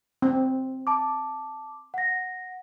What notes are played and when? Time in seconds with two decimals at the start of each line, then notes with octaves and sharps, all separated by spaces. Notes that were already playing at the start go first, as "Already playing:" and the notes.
0.22 C4
0.87 A5 D6
1.94 F#5 A#6